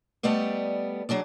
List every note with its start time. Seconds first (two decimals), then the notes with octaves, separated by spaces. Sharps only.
0.23 G3 A3 B3 D5 D#5
1.09 F#3 D4 G#4 D5